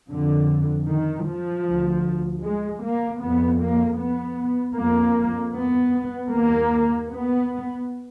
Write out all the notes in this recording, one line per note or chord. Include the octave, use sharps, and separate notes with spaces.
F2 D3
D#3
F3
D2
G#3
A#3
F2 B3
A#3
B3
F2 A#3
B3
D#2 A#3
B3